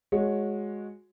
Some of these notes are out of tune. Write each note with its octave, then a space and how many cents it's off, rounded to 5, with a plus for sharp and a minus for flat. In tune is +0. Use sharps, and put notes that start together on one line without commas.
G#3 +0 F#4 -20 C#5 +0